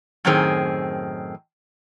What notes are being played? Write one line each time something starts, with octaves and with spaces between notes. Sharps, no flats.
F#2 A2 D#3 C4 G#4